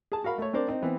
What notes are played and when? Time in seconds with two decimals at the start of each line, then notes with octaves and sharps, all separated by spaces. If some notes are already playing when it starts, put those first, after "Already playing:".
0.12 G#4 A5
0.24 F#4 A#4 F5 B5
0.38 A3 C#5
0.53 C4 D4 A#4 C5 D5
0.68 C4 D#4
0.82 E3 B3 C4